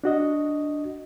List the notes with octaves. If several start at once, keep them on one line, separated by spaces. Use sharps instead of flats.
D4 F#4 D#5